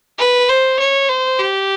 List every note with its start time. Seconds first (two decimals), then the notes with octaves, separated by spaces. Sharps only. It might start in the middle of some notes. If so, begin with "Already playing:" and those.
0.19 B4
0.49 C5
0.79 C#5
1.09 C5
1.40 G4